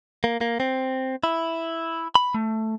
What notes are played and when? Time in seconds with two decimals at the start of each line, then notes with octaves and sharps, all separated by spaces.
0.24 A#3
0.41 A#3
0.60 C4
1.24 E4
2.15 B5
2.34 A3